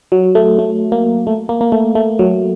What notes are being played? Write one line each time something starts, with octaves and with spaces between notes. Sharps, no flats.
F#3
A3
A3
A#3
A3
A#3
A#3
A3
A3
F#3